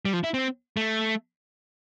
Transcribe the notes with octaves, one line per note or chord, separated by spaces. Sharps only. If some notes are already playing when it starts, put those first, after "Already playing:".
G3
F3
E4
C4
A3